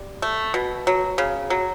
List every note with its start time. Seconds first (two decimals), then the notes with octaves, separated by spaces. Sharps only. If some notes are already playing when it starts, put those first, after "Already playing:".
Already playing: G3
0.22 A3
0.54 B2
0.87 F#3
1.18 C#3
1.50 F#3